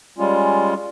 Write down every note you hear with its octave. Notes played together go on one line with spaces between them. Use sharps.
G3 G#3 C#4 F4